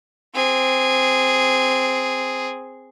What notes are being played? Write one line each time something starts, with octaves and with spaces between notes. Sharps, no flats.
C4 G#4